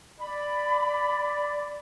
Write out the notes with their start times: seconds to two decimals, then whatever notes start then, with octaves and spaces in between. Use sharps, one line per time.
0.20 D5 B5